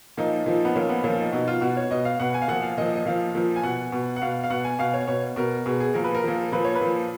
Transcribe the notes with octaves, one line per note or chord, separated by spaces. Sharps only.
A#2 F3 D#4
A#2 F3
B3
A#2 F3 C#4
B3
A#2 F3 C#4
D#4
B2 D#4
F4
B2 F#4
C#5
B2 D#5
F5
B2 F#5
G#5
F5
A#2 F3 F#5
F5
A#2 F3 D#5
D#5
A#2 F3 F5
A#2 F3
G#5
B2 F#5
B2
F#5
B2 F5
F5
B2 F#5
G#5
B2 F5
C#5
B2 C#5
B2 A#4
B2 G#4
G#4
A#2 F3 A#4
B4
A#4
A#2 F3
A#2 F3 B4
C#5
B4
A#2 F3